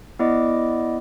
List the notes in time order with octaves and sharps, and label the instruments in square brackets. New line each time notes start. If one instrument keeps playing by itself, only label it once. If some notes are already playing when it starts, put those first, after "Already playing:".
[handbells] B3 E4 D5 D#5 D6